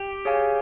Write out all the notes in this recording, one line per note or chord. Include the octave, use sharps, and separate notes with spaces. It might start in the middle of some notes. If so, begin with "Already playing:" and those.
Already playing: G4
G#4 C#5 F5 G#5